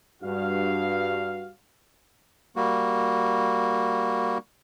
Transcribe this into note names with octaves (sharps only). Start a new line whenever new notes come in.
G2 F#4 F5
G3 A#3 F#4